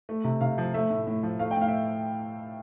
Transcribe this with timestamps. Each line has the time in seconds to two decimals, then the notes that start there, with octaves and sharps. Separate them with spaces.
0.09 A3
0.24 C3
0.41 C3 F5
0.58 F3
0.74 A3 E5
0.90 A2
1.07 A2
1.23 F3
1.39 A3 F5
1.51 G5
1.56 A2 F5
1.68 E5